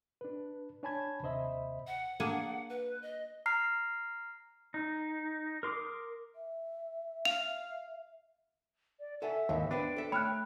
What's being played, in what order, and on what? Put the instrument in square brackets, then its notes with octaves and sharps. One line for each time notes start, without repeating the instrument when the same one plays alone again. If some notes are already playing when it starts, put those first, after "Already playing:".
[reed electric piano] D4 B4
D4 C#5 G#5 A5 B5 G#6
D#2 C3 C5 D#5 E5 B5
[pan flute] F#5
[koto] A#3 D4 G#4
[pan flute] B4
D#5
[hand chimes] A#5 F6 C7
[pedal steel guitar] D#4
A#4 C6 D6 D#6
[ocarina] E5
[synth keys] F5 [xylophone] F7
[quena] D5
[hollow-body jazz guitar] A4 F#5 G#5 [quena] E5
[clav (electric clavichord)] D#2 [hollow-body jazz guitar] G#2 E3
[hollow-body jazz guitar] B3 B4 C5 [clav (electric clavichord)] D4 [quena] G5
[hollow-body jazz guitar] A4 E5
[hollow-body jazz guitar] A3 [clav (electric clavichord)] C#5 [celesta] B5 F6 F#6